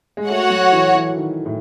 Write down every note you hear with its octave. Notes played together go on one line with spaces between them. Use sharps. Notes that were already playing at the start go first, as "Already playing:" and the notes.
G#3
A3 F#4 C#5 F#5
F#3
E3
E3
D#3
A2